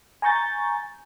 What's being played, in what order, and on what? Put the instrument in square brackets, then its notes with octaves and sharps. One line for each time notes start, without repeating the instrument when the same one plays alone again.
[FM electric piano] G#5 A#5 C#6 G6 A6